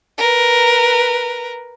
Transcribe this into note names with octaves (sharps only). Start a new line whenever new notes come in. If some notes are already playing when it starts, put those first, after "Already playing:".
A#4 B4